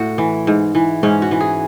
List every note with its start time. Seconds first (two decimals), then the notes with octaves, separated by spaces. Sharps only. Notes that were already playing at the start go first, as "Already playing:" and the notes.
Already playing: A2 F#4
0.18 E3
0.47 G#2
0.75 E3
1.03 G#2 C#4
1.22 F#4
1.31 E3
1.40 G#4